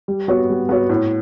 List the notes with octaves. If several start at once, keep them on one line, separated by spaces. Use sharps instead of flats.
G3
B3 F#4 C#5
G3
B3 F#4 C#5
A2